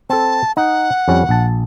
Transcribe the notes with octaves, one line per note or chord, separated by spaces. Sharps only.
C4 A4 A5
D#4 F#5
F2 G3 C#4
A#1 A5